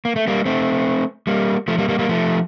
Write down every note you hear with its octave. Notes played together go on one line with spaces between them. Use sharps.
A#3
A3
G3 A#3
A3 C4
G3 A#3
F3 A3
G3 A#3
G3 A#3
G3 A#3
F3 A3